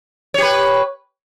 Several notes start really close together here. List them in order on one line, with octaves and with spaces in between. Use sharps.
C#5 G4 B4